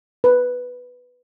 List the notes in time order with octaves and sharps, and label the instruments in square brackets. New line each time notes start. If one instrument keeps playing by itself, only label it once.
[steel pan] B4